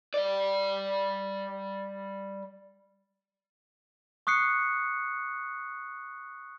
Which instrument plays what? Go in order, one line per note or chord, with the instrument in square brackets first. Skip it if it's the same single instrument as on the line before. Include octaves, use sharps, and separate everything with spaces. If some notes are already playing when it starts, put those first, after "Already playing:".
[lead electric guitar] G3 D5
[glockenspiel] C#6 D#6 F#6 C7 C#7